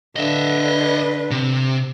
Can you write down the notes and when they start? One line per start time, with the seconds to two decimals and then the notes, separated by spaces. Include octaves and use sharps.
0.16 D3 B4 D#5 E5
1.31 C3